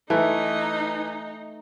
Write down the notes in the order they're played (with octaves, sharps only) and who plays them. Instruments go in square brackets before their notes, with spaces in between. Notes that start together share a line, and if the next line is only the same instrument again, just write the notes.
[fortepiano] E3 [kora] A3 [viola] D#4